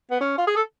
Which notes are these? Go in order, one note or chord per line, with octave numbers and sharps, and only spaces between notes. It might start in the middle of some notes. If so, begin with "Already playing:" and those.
B3
C#4
F4
G#4
A4